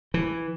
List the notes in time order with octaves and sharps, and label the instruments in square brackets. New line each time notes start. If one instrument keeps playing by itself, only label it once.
[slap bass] E3